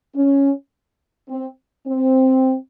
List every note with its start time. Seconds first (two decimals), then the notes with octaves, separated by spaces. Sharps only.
0.16 C#4
1.29 C4
1.87 C4